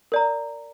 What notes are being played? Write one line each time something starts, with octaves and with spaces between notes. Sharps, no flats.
A#4 D5 A#5